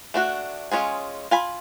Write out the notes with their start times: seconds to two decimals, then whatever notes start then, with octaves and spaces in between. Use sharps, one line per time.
0.14 A3 D4 F#4
0.72 G#3 C#4 F4 G#4
1.31 F4 G#5 B5